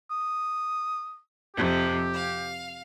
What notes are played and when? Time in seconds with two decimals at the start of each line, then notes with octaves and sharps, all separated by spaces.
0.10 D#6
1.55 F2 C3 G4
2.12 F5